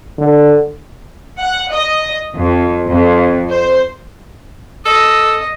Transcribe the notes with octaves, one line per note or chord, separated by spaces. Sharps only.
D3
F#5
D#5
F2
F2
C5
A4 D#5